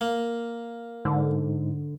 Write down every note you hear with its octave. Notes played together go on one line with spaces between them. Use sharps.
A#3
G#2 D3